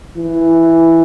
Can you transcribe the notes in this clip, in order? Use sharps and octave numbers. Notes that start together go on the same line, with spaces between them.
E3